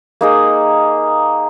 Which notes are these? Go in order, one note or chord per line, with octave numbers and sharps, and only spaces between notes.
A#3 D#4 G#4